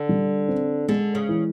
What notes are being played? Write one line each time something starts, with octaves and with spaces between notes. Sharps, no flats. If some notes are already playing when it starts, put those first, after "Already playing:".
Already playing: D3
G3
C4
D3 G#3
C#3
E3